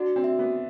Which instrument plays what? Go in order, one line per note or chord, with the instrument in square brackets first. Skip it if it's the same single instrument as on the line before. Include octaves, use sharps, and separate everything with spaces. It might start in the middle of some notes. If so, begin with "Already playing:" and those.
Already playing: [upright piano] D4 [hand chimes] F#4
[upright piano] C4
[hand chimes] E5
[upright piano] B3